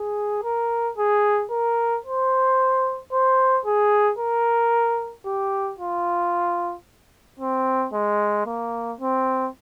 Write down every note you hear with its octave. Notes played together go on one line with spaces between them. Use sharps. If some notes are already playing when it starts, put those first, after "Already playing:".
Already playing: G#4
A#4
G#4
A#4
C5
C5
G#4
A#4
G4
F4
C4
G#3
A#3
C4